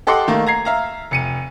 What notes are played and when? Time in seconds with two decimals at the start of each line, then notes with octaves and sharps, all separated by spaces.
0.07 G4 A4 D#5 F#5 C6 D6
0.28 D#3 A3 A#3
0.47 A#5 G#6 C7
0.65 E5 F5 A#5
1.11 F1 C#7 D#7